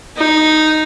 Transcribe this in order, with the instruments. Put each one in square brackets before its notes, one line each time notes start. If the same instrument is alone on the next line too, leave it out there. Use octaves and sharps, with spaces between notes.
[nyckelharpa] D#4